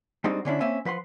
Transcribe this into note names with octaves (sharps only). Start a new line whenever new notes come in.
G3 G#3 C4 D4 D#4 F#4
D3 C#4 D4 E4
A#3 C4 C#4 E5 G#5
F3 B4 F#5 C6